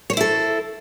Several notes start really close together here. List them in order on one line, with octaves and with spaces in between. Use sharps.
C#5 C5 E4 A4